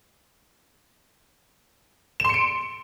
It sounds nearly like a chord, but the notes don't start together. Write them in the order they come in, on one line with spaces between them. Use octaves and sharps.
E7 C6 C#7 D7